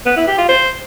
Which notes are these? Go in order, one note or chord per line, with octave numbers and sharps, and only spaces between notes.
B3
E4
G4
F4
C5